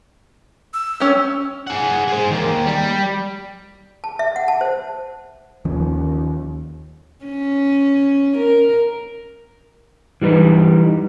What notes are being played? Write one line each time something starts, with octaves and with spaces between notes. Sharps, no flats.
E6
C#4 G4
G#4 F#5
G#4 C5
D#3 A#3
G3
A5
E5
F#5
A5
C5
D#2 D#3 F3 C#4
C#4
A#4
E3 G3 D#4 B4